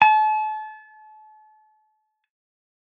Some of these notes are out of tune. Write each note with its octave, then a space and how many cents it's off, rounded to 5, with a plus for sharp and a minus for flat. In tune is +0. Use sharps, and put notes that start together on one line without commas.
A5 -35